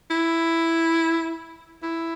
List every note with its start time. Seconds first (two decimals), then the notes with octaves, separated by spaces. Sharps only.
0.10 E4
1.83 E4